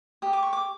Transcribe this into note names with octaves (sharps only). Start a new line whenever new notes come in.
G4 D#6
D6
C#6
D6